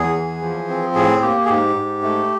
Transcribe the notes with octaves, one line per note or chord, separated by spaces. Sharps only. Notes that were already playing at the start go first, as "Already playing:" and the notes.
Already playing: E2 G#4
E3
F3
C4
A2 G#4
A#3 G4
G#4
G#2 G4
G#2
A3